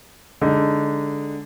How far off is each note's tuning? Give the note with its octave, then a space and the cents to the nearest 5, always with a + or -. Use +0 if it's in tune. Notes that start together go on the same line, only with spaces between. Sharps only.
D3 -10 G#3 +0 D#4 +0